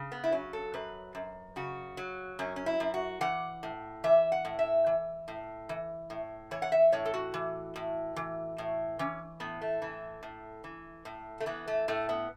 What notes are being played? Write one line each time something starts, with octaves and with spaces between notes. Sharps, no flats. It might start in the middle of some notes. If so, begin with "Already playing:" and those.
Already playing: C#3
B3
E4
F#3 C#4
A4
F#2 B4
F#2
C#3 F#4
F#3
F#2 C#4
C#4
E4
F#2
F#4
E3 F#5
A2
E3 E5
F#5
A2
E5
E3
A2
E3
A2
E3 C#5
F#5
E5
A2 C#5
A4
F#4
E3
A2
E3
A2
E3 C#4
A2 B3
A3
E3
A2
E3
A2
A3
E3 B3
A3
A2 A3
B3